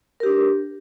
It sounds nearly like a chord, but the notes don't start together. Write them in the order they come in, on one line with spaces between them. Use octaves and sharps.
A#4 G4 D4